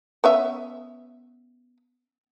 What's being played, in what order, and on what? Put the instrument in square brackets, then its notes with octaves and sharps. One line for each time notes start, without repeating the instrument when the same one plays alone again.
[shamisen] B3 C#4 E5